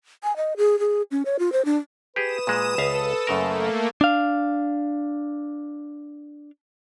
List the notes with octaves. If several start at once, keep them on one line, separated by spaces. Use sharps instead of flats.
G#5
D#5
G#4
G#4
C#4
C#5
F4
C5
D4
G4 G#4 B4 D#6 E7
A#2 G#3
C#2 A4 E5 F5
F#2 C#3 A3 A#3 A#4
D4 F5